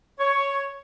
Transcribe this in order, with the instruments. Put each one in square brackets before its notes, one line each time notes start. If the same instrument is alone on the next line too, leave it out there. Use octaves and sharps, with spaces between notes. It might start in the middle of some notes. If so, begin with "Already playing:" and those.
[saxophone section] C#5